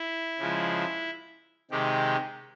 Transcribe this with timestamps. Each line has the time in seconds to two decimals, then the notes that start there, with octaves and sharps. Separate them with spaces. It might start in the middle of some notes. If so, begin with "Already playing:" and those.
Already playing: E4
0.39 C#3 F3 G#3
1.71 C3 D#3 G#3 G4